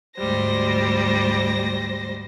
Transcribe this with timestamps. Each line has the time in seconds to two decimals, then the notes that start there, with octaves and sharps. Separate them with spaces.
0.17 D2 G#2 G3 C5 A#6